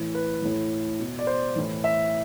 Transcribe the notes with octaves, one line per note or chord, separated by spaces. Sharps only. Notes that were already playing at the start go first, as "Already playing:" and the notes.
Already playing: A2 E3
B4
A2 E3
B2
D5
C5
A2 E3
E5